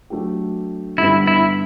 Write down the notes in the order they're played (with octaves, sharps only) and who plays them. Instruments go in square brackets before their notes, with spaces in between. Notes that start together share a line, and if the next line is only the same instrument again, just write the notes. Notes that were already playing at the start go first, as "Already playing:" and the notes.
[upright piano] F#3 A3 D4 G4
[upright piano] G2 D3 G3 B3 [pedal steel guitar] E4
[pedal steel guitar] E4